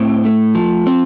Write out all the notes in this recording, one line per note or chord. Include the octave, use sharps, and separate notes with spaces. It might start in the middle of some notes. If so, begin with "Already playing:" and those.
Already playing: A2 C4
A3
F3
C4